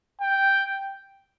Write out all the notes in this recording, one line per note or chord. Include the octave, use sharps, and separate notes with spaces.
G5